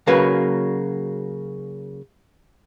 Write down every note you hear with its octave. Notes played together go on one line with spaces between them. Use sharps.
C#3 F#3 A#3 F#4 B4